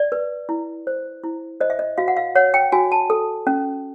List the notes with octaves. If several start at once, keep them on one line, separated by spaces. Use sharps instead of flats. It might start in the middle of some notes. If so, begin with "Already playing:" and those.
Already playing: D5
B4
E4
C5
E4
C5 D#5
E5
D#5
F#4 F5
F#5
F5
C#5 F#5
G5
F#4 G#5
A5
A4
C#4